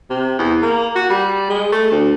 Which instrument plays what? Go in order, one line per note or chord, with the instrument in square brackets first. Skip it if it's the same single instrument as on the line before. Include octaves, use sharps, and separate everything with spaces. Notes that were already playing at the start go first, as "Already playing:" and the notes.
[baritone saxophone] C3
E2
A#3
F#4
G3
G#3
A3
D2